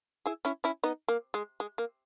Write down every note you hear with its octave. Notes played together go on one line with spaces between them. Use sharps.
E4 G#4
C#4 E4
C#4 E4
B3 D#4
A#3
G#3
G#3
A#3